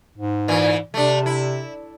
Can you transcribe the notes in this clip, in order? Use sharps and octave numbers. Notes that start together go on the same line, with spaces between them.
G#2
A#2 E3
C3 A3 D4
E4